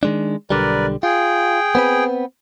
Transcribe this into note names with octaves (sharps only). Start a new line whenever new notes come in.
D#3 G#3 D4
B1 D3 G3 A#4 B4 D5
F4 G#4 G5
B3 C4 B4